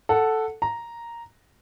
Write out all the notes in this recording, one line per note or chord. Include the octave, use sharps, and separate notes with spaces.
A4 F#5
A#5